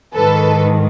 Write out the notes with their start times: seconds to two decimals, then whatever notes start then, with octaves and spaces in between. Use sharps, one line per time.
0.15 G#2 D#3 A4 B4